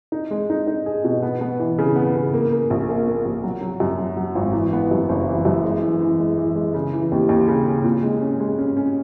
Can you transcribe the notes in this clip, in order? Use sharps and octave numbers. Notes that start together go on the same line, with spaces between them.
D#4
G#3
D#4
D#4
G#4
B2
B3
B3
E3
C#3
B3
C#3
A#3
A#3
A#1
A#3
A#3
A#1
F#3
F#3
F#2
F#3
F#3
G#1
E3
B3
F#2
F#1
E3
F#2
G#3
E3
E3
G#3
E3
G#3
C#3
E3
D#2
D#2
C#3
C#3
A#2
G#3
C#4
G#3
C#4
C#4